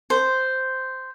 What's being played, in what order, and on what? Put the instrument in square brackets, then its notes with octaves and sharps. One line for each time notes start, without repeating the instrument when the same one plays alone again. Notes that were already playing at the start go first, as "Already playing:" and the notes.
[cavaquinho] C5